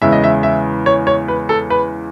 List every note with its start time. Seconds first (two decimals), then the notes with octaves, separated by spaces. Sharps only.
0.01 E2 C#3 G#3 E5
0.12 D#5
0.24 E5
0.43 E5
0.86 C#5
1.07 C#5
1.28 B4
1.49 A4
1.70 B4